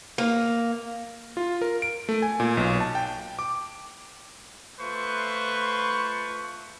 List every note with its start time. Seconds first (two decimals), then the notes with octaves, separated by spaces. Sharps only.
0.18 A#3
1.37 F4
1.62 A#4
1.82 D7
2.09 A3
2.22 G#5
2.40 A#2
2.57 B1
2.81 A5
2.95 G5
3.39 D6
4.80 A3 F4 B4 C5 C#6